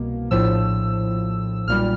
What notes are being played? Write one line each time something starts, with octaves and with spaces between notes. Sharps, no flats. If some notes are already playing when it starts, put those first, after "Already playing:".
Already playing: C2 B2 A#3
A#1 A2 F3 E6
B1 A#2 G3 F6